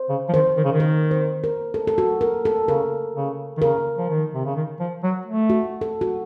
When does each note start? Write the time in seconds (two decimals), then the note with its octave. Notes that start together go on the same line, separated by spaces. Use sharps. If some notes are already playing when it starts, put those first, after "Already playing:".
Already playing: C5
0.09 C#3
0.29 F3
0.33 D#3 C5
0.57 D#3
0.65 C#3
0.72 D#3
0.80 A#4
1.11 C5
1.44 A#4
1.74 A4
1.87 A4
1.98 F#4
2.21 A#4
2.45 A4
2.68 C#3 A#4
3.16 C#3
3.58 D#3
3.62 C#3 A#4
3.98 F3
4.10 D#3
4.34 C3
4.45 C#3
4.56 D#3
4.80 F3
5.03 F#3
5.26 A3
5.50 F#4
5.81 A4
6.01 F#4